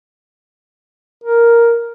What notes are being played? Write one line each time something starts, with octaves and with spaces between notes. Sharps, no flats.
A#4